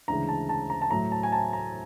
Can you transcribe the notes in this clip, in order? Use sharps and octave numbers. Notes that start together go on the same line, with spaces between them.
D2 C#3 E3 G#3 A#5
A5
A5
A#5
A5
A2 F#3 A3 A#5
A5
G#5
A5
A#5